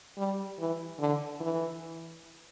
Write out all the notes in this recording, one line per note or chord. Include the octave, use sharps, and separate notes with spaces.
G3
E3
D3
E3